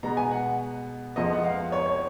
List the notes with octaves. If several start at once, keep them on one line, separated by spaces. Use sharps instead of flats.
B2 G#3 B3 A#5
G#5
F#5
F2 F3 G#3 B3 D#5
F#5
F5
C#5
C#5